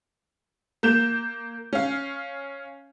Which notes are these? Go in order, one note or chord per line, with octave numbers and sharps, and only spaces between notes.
A#3 G6 E7
C#4 F5